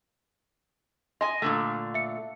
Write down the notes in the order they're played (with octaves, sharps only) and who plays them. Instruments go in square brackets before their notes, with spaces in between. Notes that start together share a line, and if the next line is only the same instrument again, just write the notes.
[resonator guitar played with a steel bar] D#5 G#5 [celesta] C6
[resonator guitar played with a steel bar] A#2 D3 A3
[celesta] E5 C#7